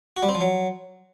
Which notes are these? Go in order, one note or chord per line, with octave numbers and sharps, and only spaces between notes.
F#4
G3
C4
F3
F#3